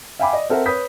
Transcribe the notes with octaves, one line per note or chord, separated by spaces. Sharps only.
E5 F5 G5 G#5 B5 D6
D5 D#5
C4 A4 A#4 E5 F#5
B4 C#5 D#6 G6 B6